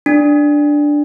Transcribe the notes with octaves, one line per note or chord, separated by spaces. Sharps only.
D4